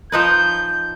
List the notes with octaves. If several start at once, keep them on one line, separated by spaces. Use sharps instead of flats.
F3 D#4 B4 G6